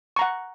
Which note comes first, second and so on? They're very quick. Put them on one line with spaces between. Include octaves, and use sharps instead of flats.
C#6 A#5 F#5